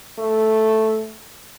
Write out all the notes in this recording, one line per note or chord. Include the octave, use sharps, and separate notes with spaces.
A3